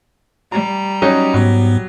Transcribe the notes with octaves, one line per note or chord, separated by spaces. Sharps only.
G3 A#5
F#3 C#4 D#4
G#2 F#3 B3